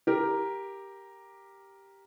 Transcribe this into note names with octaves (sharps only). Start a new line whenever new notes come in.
G4 A#4